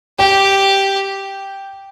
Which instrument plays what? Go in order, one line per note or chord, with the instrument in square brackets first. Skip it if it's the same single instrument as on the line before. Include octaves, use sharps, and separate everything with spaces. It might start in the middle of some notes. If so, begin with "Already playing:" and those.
[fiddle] G4 [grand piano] G5